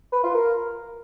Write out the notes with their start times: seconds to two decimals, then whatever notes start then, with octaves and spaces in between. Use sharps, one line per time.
0.13 B4
0.23 F4
0.34 A#4